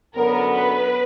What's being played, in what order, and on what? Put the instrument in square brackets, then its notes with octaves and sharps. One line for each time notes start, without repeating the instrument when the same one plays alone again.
[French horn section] F#2 D3 F#3 B3 [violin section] A#4
[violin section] B4